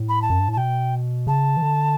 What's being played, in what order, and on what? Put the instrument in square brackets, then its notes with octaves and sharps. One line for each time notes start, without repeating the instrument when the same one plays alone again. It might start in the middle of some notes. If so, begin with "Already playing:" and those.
Already playing: [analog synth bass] A2
[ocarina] B5
A5
[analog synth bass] F#2
G2
A2
[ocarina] A5
[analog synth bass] B2 [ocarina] G5
[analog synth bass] C#3 [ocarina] A5
[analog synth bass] E3
D3